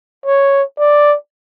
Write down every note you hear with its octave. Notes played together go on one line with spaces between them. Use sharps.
C#5
D5